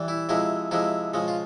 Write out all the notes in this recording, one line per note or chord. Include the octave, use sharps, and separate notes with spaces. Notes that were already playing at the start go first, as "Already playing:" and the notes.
Already playing: E3 G3
E4
C3 F3 G#3 E4
C3 F3 G#3 E4
C#3 F3 G#3
F4